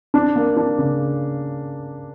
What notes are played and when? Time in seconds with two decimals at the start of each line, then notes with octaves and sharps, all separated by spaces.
0.14 D4
0.36 A#3
0.57 D4
0.78 C#3